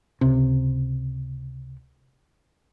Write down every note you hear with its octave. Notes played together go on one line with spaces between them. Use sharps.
C#2 C3